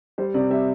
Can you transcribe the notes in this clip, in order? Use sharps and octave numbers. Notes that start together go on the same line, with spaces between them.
G3 C5
C3 D5
G3 E5